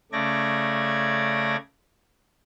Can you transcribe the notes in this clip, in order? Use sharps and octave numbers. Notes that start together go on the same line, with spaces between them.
C#3 A3 D5 G#6 A#6